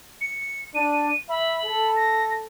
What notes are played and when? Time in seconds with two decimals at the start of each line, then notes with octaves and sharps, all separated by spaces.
0.21 C#7
0.75 D4 D#7
1.29 E5 B5
1.65 A4
1.96 A#6